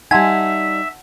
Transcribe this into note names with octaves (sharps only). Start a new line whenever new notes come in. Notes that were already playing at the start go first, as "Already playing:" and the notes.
G3 D#4 E5 F#5 G#5 A5 C6